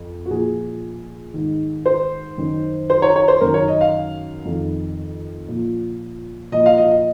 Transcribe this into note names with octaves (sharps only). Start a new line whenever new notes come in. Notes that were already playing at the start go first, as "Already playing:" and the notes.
Already playing: F2
F#4
A#2 F3 G#4
G#2 D#3
C5
F#2 D#3
C5
C#5
C#5
C5
F#2 D#3 A#4
C#5
D#5
F5
F2 D#3
A#2 F3
A#2 F3 D#5
F5
D#5
D#5